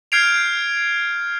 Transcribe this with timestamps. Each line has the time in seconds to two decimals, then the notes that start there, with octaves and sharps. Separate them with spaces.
0.12 F6 G6 G#6 C7 D7 F7